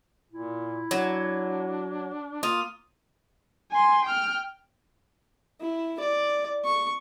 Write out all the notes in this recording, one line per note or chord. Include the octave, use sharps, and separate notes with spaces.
A#2 E4
F#3 D4
A#3 F4 D#6
G#5 C6
G5 F6
E4
D5
C#6